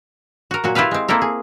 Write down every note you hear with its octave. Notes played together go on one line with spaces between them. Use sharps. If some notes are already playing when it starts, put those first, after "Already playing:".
F#4 A#4
A#2 F#3 F#4
E4 F4 G4 B4 F5
G#3 C4
A#3 C4 E4 A4 A#4
G#4